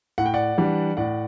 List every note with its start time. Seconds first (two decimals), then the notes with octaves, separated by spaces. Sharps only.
0.18 A2 F#5
0.26 G5
0.34 D5 F#5
0.58 E3 G3 D4
0.97 A2 D5 F#5